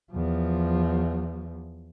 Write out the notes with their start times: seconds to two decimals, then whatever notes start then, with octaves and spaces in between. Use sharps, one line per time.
0.12 E2 F3